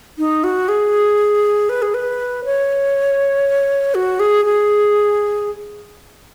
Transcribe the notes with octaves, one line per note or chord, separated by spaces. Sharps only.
D#4
F#4
G#4
B4
G#4
B4
C#5
F#4
G#4
G#4